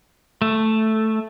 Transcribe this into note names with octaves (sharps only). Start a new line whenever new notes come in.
A3